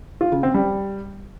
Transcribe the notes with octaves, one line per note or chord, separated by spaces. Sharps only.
F4
C#3
C4
G3